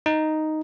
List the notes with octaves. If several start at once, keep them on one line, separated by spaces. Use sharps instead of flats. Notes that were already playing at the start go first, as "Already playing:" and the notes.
D#4